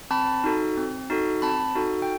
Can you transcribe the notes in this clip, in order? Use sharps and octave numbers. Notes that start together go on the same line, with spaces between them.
C4 A5 B5
D#4 F#4 A4
C4
D#4 F#4 A4
C4 A5 B5
D#4 F#4 A4
G5